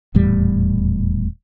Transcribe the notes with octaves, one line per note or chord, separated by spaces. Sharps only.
D#1 E2 A2 G3